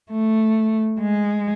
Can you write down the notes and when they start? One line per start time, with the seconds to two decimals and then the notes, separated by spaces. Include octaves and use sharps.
0.11 A3
0.99 G#3